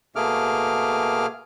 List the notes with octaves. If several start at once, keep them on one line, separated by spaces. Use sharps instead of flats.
B2 A3 A#3 G#4 D6 F6